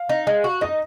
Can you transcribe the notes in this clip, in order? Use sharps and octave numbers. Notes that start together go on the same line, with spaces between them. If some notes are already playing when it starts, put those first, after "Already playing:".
Already playing: F5
D#4
G#3
F#4
D#4 D#5